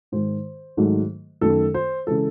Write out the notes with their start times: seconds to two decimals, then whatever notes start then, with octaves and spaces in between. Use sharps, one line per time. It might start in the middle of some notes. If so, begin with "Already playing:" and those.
0.12 G#2 D#3 G#3 C5
0.77 G#2 D#3 F#3 A3
1.41 F#2 D#3 A3 A4
1.74 C5
2.07 C#3 E3 G#3 A4